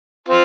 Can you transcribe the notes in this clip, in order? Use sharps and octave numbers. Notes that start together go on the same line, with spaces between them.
C4 F4